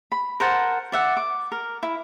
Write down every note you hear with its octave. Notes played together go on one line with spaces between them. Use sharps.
B5
A#4 C5 F#5 A5
D5 E5 F#5
D6
A#4
E4